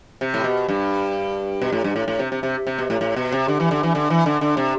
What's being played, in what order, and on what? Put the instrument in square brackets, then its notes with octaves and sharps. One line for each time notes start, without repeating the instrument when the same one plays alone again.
[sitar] C3
A2
B2
G2
B2
A2
G2
A2
A2
C3
C3
C3
C3
B2
A2
A2
B2
C3
D3
E3
D3
E3
D3
E3
D3
D3
C3